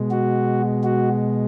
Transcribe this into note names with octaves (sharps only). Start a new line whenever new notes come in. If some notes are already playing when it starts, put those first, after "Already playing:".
Already playing: B2 G#3
F#4
F#4